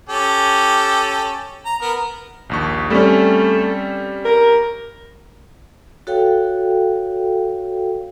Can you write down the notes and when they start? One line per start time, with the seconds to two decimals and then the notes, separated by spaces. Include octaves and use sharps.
0.09 C#4 G4 A4
1.66 A#5
1.82 B3 A#4
2.50 A#1 D#2 C#6
2.90 G3 A3 C4 C#4
4.25 A#4
6.07 F#4 A4 C#5 F5 G5